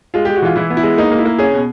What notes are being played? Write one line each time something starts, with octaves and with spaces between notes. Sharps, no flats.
G#3 F4
G#3 G4
F#4
E3 F4
E3 E4
B3
E4
G#3
A#3 D#4
A#3
E4
A#3
C#4 G#4
B2